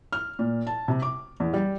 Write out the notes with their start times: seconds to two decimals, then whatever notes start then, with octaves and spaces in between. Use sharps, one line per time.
0.12 F6
0.39 A#2
0.67 A5
0.88 C3
1.02 D6
1.40 E2
1.54 G3